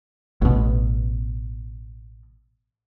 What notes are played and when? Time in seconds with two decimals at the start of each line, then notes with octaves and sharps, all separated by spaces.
0.42 A1 B2